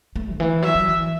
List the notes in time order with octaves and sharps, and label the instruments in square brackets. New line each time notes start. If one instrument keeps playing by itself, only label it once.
[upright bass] A3
C#3
E3
[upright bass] F#3 [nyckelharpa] E5
[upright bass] F#3
E3